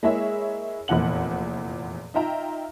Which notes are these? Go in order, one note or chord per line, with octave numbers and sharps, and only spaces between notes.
G#3 A#3 E4 G#4 C#5 E5
F1 E2 A#2 F#5 F#7
D#4 F4 E5 G5 A#5